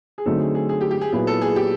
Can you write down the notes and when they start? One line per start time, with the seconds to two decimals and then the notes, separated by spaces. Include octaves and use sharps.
0.18 G#4
0.26 D3 F#3 A3 C4 D#4 A4
0.40 G#4
0.55 G#4
0.69 G#4
0.81 G4
0.91 G4
1.01 G#4
1.12 A#2 F#3 B3 E4 G#4
1.27 A4
1.41 G#4
1.56 G4